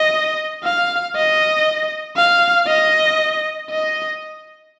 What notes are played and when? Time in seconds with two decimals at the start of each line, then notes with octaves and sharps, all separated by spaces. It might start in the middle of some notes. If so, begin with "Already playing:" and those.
Already playing: D#5
0.64 F5
1.16 D#5
2.17 F5
2.67 D#5
3.70 D#5